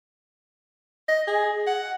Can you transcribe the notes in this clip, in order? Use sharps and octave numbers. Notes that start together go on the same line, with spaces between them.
D#5
G#4
F#5